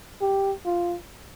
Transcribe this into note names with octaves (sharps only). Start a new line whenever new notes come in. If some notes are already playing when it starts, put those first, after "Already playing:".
G4
F4